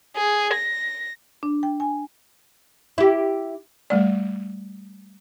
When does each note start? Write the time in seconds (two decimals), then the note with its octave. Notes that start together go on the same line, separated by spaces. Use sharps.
0.16 G#4
0.53 A#6
1.43 D4
1.63 G5
1.80 G#5
2.98 E4 G4
3.90 G3 A3 D5